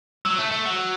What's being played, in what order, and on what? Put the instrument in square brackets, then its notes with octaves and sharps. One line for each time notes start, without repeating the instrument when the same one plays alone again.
[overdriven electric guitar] F#3 [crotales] E6
[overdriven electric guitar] A3
A3
F#3